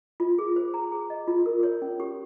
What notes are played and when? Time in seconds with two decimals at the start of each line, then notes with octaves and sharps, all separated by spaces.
0.20 F4
0.38 G#4
0.56 C5
0.74 A#5
0.92 G#4
1.10 D#5
1.28 F4
1.46 A#4
1.63 C#5
1.82 C#4
2.00 G4